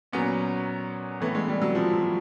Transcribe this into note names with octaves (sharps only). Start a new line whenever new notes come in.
A#2 F#3 B3 C#4
A2 E3 A3 B3
G#3
G3
F#3
F3
F#3